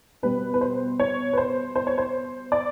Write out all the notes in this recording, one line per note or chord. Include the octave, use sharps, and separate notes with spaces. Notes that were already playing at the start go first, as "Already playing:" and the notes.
B2 G3 B3 B4
B4
C5
C#5
B4
C5
C5
C#5
C5
D5